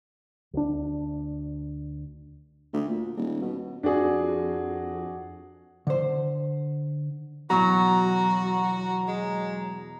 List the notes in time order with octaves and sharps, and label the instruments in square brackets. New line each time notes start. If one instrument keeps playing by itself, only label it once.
[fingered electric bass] D2 D4
[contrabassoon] D2
A#2
D#1
B2
[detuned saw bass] F2 [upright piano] D4 F#4 G#4
[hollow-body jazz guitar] D3 C5
[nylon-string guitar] E2 B2 [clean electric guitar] F#3 [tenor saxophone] F#4 [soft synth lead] A#5
[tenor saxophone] G#3